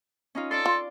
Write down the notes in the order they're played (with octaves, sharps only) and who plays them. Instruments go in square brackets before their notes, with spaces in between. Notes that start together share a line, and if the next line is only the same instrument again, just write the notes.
[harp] C#4 D#4 F4
[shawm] A4 [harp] D5 C6
[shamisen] F4